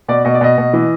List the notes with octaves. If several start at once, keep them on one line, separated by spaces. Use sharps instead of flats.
B2 D5
B2 D#5
D5
B2 D#5
B2
E3